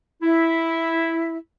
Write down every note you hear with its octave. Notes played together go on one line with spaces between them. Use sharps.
E4